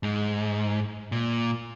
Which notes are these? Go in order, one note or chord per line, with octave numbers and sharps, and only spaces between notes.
G#2
A#2